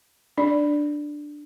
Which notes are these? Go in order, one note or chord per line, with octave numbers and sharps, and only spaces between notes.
D4 D5